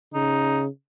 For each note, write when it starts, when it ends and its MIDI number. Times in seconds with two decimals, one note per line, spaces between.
0.14 0.68 49
0.14 0.62 63